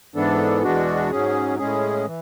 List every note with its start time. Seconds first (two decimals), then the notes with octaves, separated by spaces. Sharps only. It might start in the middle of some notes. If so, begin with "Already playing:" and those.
0.15 G#2 E3 B3 D4 A4
0.63 E2 B2 G#3 D4 F#4
1.11 G#2 F#3 C#4 G#4
1.58 A2 G#3 C#4 G#4
2.06 E3